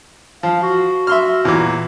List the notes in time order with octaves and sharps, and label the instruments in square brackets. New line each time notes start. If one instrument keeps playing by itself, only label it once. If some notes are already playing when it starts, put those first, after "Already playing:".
[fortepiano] F3 [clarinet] F5
[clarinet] F#4
[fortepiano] E5 C6 F6
E2 A#2